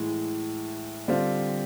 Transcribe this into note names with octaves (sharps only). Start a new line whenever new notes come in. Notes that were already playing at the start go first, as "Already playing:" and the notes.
Already playing: A2 E3 G#3
D3 G3 C4 F4